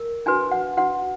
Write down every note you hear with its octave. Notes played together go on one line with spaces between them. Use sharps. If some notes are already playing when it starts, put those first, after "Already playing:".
Already playing: A#4
D4 F#4 B4 G#5
F#5
D4 F#4 B4 F#5